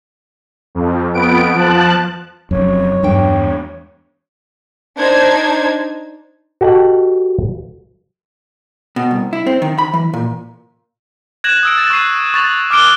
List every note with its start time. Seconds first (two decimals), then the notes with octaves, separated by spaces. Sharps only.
0.75 F2
1.14 F2 B3 D7
1.55 F3 A5 F#6
2.51 F1 F#2 C#5
3.03 E2 G2 D4 G5
4.97 D4 D#4 C5 G#6
6.61 F#4 G4 A4 D#5 F#5
8.96 B2
9.11 C2
9.33 E4
9.47 C4
9.62 D#3
9.78 B5
9.93 E3
10.14 A#2
11.44 F#6 G#6 A#6 E7 F#7
11.63 D#6 E6 D7
11.78 A6
11.90 C#6 F#6 C7 D#7
12.34 C#6 A6 F7 F#7
12.71 D6 F6 F#6 D7 G7